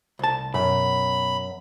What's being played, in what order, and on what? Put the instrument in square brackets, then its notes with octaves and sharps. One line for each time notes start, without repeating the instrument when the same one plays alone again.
[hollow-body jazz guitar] C2 A5
[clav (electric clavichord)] F#2 [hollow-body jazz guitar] B2 [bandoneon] B5